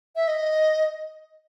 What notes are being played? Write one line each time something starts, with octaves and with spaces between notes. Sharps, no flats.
E5
D#5